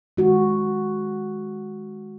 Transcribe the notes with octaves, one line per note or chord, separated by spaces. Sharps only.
D#3 G#3 F#4